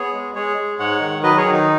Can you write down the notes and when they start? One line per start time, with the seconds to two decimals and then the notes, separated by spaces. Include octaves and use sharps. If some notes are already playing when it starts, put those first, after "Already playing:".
Already playing: B3 G#4 C#5
0.13 G#3
0.35 G#3 G#4 C#5
0.57 G#3
0.79 G#2 C#5 F#5
1.00 D#3
1.23 F#3 B4 D#5
1.37 G#4 C#5
1.45 D#3
1.53 D#4